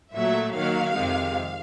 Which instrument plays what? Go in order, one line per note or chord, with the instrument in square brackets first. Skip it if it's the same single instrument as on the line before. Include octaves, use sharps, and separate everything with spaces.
[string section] A#2 F#3 A3 E5
D#3 F#3 A#3 F5
F2 C3 D#3 G#3